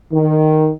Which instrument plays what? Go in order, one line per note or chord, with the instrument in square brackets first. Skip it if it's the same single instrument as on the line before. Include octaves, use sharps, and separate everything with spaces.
[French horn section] D#3